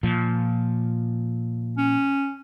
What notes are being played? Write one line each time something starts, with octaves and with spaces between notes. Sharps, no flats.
A#2 F3
C#4